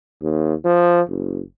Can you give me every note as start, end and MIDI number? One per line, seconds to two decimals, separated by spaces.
0.22 0.54 39
0.65 1.01 53
1.09 1.40 30